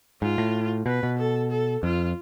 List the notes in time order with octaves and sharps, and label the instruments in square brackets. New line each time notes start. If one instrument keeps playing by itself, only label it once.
[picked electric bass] G#2 [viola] F4
[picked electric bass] A2
[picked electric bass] B2 [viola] B4
[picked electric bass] B2
[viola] A4
A4
[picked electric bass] F2 [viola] F4